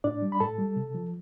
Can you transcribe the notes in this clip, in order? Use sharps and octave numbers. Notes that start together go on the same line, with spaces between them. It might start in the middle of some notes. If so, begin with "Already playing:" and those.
A2 D4 D5
G3
B5
A2 A4 A5
G3
C3
F3